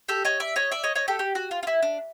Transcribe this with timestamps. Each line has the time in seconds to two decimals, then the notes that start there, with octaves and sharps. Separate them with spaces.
0.09 G4 A4
0.25 C#5 D#5
0.40 D5 E5
0.56 C#5 D#5
0.72 D5 E5
0.83 C#5 D#5
0.95 C#5 D#5
1.08 G4 A4
1.19 G4
1.35 F#4
1.51 F4
1.63 F4
1.67 E4
1.82 D4